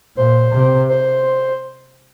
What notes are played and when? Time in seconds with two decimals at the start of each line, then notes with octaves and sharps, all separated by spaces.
0.17 A#2 C5
0.53 C3
0.89 C5